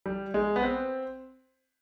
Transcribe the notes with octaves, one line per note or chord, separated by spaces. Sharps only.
G3
G#3
B3
C4